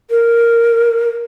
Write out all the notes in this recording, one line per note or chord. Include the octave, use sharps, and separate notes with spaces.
A#4